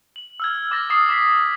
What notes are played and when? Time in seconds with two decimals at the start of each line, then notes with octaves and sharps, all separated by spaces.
0.16 F#7
0.40 E6 F6 G#6
0.71 D6 F6 A6 A#6
0.90 D6 D#6 C7
1.09 D6 B6 C7